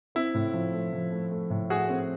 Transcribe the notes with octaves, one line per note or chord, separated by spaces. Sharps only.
C4 E4
A2
F3
A3
F3
A3
A3
A2
A3 F#4 G#4
C4